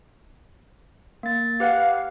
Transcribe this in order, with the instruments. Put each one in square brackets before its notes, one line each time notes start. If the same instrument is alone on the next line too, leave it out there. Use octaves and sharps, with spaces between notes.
[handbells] A#3 A6
[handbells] G4 B4 F#5 [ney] F5